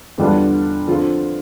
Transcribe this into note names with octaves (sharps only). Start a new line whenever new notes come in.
E2 D3 G3 D4 F4
D3 F3 C4 F4